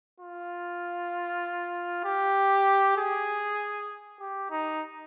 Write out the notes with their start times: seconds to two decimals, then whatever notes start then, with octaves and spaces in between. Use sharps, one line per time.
0.20 F4
2.04 G4
2.97 G#4
4.20 G4
4.51 D#4